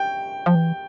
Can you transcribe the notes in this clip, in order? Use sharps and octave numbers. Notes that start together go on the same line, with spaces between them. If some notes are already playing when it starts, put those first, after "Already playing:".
Already playing: G5
F3
E3